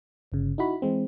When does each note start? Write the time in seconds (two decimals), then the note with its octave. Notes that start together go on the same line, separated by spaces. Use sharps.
0.32 G1 C#3
0.58 D#4 E4 F#4 B5
0.82 E3 G#3 C4